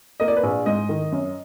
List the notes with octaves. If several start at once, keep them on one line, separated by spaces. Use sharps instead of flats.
A#3 D#5
D5
B4
A#1 D5
G#2 D#5
D#3
F#2